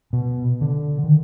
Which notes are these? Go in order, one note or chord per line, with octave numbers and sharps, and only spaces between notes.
B2
D3
D#3